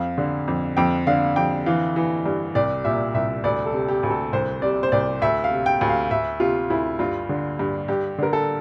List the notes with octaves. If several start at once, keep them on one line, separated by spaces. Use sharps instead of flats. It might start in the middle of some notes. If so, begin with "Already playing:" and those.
Already playing: F2 F5
D3
F2
F2 G5
D3 F5
F2 G5
E3 F5
E3
G2
C2 D5
A#2 E5
C2 E5
D2 D5
A4
C3
G4
D2
A4
C2 C5
C3 D5
C5
C2 D5
D2 E5
F5
C3
G5
D2
F5
D2 E5
C3 F4
D2 E4
G2 F4
D3
G2
G2 G4
D3 A#4
A4